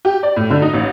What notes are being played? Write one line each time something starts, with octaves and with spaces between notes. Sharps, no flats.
G4
D5
A2
D3
D#4
A1